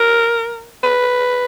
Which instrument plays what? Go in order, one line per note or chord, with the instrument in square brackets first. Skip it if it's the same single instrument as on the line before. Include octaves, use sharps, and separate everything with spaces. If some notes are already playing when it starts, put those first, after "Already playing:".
Already playing: [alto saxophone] A#4
B4